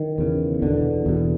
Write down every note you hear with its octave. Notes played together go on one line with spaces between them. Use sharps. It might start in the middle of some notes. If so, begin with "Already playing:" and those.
Already playing: D#3
E2 C#3
E2 B2 D3
E2 B2